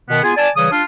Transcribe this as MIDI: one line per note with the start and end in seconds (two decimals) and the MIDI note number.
0.10 0.19 47
0.10 0.19 51
0.10 0.19 59
0.23 0.34 59
0.23 0.34 65
0.23 0.34 68
0.23 0.34 80
0.37 0.49 74
0.37 0.49 80
0.37 0.49 81
0.56 0.71 49
0.56 0.71 52
0.56 0.71 55
0.56 0.71 73
0.56 0.71 87
0.71 0.83 62
0.71 0.83 65